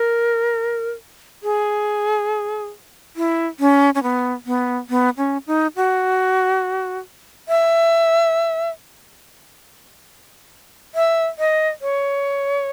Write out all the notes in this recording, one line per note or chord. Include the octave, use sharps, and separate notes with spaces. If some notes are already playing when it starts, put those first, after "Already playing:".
Already playing: A#4
G#4
E4
C#4
C#4
B3
B3
B3
C#4
D#4
F#4
E5
E5
D#5
C#5